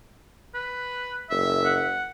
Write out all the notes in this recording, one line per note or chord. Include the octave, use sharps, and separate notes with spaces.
B4
F#1 E5
F#5